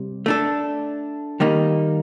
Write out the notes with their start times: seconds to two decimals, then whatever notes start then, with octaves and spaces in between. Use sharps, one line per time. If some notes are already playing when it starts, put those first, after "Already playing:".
Already playing: C3 G3
0.26 A3 D4 A4
1.40 D#3 G3 A#3 D#4